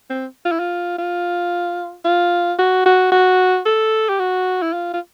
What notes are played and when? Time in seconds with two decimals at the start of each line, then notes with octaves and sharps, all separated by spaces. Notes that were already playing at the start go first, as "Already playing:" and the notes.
0.10 C4
0.45 F4
0.52 E4
0.59 F4
0.98 F4
2.05 F4
2.59 F#4
2.86 F#4
3.12 F#4
3.65 A4
4.09 G4
4.19 F#4
4.62 E4
4.73 F4
4.93 F4